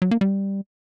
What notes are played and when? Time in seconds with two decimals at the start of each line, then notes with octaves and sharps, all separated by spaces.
0.02 F#3
0.11 A#3
0.21 G3